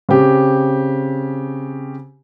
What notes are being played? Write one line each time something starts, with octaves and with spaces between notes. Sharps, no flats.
C#3 C4 G4